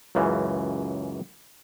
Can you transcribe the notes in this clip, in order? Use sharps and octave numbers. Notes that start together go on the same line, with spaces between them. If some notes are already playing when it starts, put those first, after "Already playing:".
C#2 F#2 C#3 E3